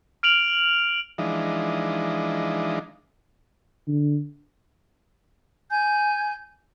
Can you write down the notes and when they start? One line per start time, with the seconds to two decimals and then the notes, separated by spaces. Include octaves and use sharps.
0.23 F6 D7 F7 F#7
1.18 E3 F3 G#3 D4 D#4
3.87 D3
5.70 G#5 G6